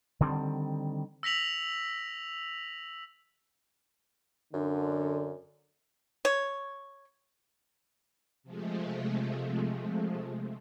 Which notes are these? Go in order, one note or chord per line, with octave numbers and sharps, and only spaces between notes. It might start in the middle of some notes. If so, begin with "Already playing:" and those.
D3 D#3 G3 C4
E6 A#6 B6 F7 F#7
F#2 D3
C#5
C3 F3 G#3 A3